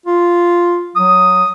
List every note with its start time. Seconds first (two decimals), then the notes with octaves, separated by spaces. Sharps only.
0.06 F4
0.96 F#3 D#6